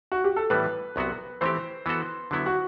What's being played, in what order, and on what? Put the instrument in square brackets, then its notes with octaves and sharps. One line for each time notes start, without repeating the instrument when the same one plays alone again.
[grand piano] F#4
G4
A4
[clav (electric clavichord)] A2 E3 G3 B3 [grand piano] B4
[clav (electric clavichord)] C2 C3 F#3 B3 F#4
[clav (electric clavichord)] E3 A3 C4 G4 [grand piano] C5
[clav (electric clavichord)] E3 B3 F#4 A4
D3 F#3 B3 E4
[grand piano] F#4